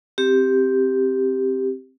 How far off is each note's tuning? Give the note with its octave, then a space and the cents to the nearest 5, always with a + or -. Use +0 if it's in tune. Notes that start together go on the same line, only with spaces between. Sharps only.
C4 +5 G4 +0